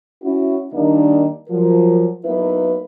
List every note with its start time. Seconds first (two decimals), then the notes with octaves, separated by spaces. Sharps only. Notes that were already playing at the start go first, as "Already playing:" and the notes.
0.23 C#4 E4 F#4
0.72 D#3 G3 A#3 D4 D#4
1.49 F3 F#3 A#4
2.25 F#3 A#3 B3 D#4 E4 B4